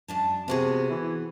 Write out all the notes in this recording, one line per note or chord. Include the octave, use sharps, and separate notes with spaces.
F#2 D4 A5
C3 B3 F#4 G#4
E3